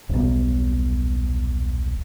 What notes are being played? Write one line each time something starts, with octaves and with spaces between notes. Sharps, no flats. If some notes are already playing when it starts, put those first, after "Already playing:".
D#1 B1